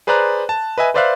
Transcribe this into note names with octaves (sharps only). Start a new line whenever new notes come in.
G#4 B4 C5 D5 A#5 F#6
A5
B4 D#5 E5 G#5
B4 C5 D5 E5 F5 F#6